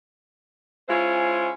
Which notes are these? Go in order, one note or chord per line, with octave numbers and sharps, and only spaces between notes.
G#3 C#4 E4 F4 C5